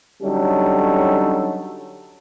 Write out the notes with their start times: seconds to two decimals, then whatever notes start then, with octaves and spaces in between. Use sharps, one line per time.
0.23 D3 F#3 G3 C#4 D#4 A4